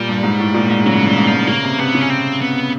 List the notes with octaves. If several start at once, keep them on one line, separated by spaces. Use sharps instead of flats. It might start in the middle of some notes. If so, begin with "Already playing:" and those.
Already playing: A#2 G3
G2
G#2
A2
A#2
G#2
C#3 F#3
G2
E3
G#2
F3
G#2
C#3 A#3
C3
C3 B3
C#3
C#4
C4
B3